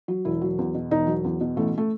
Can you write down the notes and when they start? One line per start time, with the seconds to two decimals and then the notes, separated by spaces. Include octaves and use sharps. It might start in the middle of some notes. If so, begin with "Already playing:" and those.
0.08 F#3
0.25 E1 E4
0.41 F#3
0.58 E2
0.75 B2
0.91 E1 D#4
1.07 F#3
1.24 E2
1.41 B2
1.56 A1 A3
1.78 A3